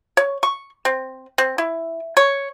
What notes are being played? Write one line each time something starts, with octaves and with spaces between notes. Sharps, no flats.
C#5
C#6
C4
C4
E4
C#5